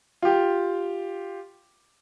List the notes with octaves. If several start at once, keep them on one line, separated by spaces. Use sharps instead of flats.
F4 G4